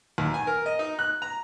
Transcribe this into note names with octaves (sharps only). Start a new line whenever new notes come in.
D#2
G#5
A#4
D#5
D#4
F#6
A#5